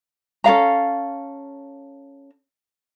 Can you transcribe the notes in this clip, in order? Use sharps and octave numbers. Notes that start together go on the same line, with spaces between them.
C#4 A4 F5 A#5